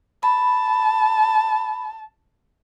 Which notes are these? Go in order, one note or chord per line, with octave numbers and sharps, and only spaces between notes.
A5 B5